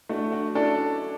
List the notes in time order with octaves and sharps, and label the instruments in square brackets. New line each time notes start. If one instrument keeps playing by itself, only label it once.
[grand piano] A3 [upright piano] D4 F#4
[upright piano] D4 F#4
[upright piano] C#4 E4 [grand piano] D4 A4 D5